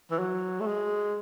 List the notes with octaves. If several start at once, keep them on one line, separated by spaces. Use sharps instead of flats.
E3
F#3
A3
G#3